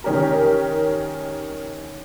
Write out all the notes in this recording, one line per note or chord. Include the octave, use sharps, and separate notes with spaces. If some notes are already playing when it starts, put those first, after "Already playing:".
D#3 C#4 G4 A#4